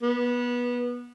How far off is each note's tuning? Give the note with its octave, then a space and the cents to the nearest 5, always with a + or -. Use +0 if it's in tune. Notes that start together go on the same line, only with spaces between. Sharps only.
B3 -20